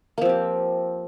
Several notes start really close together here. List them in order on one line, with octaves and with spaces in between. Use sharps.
A#3 F3 C4 G4